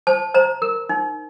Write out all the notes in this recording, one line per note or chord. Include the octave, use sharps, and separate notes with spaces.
C5 A5
C5 A#5
A#4
D#4